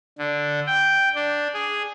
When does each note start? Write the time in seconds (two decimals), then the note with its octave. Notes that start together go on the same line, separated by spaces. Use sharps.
0.18 D3
0.66 G5
1.15 D4
1.54 G#4